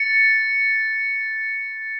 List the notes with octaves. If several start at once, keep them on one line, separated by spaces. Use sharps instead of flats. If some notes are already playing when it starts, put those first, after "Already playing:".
Already playing: A6 C#7